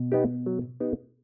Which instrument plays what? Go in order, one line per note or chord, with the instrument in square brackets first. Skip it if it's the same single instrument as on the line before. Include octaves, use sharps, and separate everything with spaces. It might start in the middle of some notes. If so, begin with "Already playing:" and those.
Already playing: [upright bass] B2
[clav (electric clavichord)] B3 D#4 G4
F#3
B3 D#4 G4